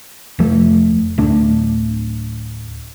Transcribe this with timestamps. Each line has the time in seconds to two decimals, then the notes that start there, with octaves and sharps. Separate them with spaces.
0.39 F1 F2 F3 A3
1.18 D1 A3 D4